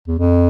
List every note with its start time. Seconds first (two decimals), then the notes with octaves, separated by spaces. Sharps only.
0.08 E2
0.19 F2